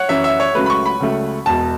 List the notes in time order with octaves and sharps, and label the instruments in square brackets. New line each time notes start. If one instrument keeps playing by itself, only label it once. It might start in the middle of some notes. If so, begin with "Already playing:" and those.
Already playing: [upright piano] C#5 F#5
[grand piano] F#2 E3 C#4 [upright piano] E5
[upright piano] E5
C#5
[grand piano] C#2 C#3 F#3 A3 [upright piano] B4
[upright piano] B5
C#6
B5
[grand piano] C#2 C#3 F#3 A3
[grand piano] E1 E2 B2 [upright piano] A5